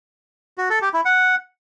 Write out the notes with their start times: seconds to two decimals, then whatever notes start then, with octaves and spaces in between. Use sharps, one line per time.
0.58 F#4
0.70 A4
0.82 G4
0.94 E4
1.05 F#5